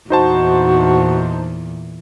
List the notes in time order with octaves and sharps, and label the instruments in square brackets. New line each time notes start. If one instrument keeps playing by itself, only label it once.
[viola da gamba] E2 A#2 [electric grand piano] D#4 C5 A5 [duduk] F#4